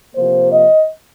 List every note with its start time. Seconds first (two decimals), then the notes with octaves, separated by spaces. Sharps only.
0.15 C3 F3 A#3 C5
0.51 D#5